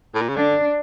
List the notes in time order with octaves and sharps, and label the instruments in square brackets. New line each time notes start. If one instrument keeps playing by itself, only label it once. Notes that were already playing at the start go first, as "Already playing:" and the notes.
[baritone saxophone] A2
A#2
C#3
[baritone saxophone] D3 [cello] D4